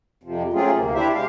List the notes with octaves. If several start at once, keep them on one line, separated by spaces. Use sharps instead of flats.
F2 C3 F3
F#3 A3 C4 C#4 F4 G#4
D2 C3 A#3
C4 D4 E4 G4 C5 E5
C3 G#3 G4 F5